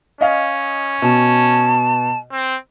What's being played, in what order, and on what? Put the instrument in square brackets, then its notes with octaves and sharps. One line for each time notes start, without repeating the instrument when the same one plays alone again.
[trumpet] C#4 [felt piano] D#5 F5
[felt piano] B2 [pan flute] A5
[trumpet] C4